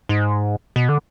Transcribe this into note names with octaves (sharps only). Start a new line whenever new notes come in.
G#2
B2
D3